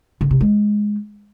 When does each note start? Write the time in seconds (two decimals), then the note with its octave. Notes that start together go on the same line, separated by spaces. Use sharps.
0.21 D3
0.31 C3
0.41 G#3